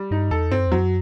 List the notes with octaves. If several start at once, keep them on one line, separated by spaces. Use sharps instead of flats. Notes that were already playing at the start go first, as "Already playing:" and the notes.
Already playing: G3
G2 D#4
E2 A4
G2 C4
F#2
E2
F#2 F#3